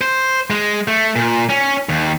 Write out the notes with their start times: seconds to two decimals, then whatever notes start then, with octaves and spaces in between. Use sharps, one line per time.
0.01 C5
0.50 G#3
0.88 A3
1.16 A#2
1.49 C#4
1.89 D#2